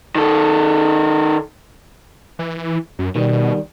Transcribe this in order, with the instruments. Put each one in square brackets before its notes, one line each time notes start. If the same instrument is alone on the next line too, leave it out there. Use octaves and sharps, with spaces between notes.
[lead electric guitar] D#3 A4
[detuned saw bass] E3
F#2
[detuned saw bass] B2 [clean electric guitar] D#3 G3